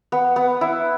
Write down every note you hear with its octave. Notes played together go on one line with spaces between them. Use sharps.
B3
B3
E4